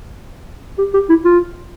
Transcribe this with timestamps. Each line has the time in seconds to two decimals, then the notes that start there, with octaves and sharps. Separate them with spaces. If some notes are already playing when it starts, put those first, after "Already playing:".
0.78 G4
0.94 G4
1.09 E4
1.25 F4